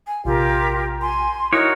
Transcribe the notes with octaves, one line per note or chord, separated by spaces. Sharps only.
G#5
A#1 C3 F4 G4 A#4
G#5 C6
D#4 E4 F#4 A#4 C#5 D#6